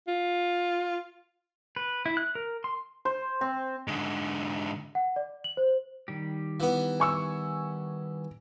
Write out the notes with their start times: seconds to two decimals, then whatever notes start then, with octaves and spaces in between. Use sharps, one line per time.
0.08 F4
1.76 B4
2.06 E4
2.17 F#6
2.35 A#4
2.64 C6
3.05 C5
3.41 C4
3.88 G#2 D3
4.95 F#5
5.16 D5
5.44 F#7
5.57 C5
6.08 D#3 G3 G4
6.60 E3 B3
7.00 G#5 C#6 E6